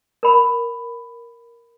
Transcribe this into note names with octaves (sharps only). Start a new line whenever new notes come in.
A#4 B5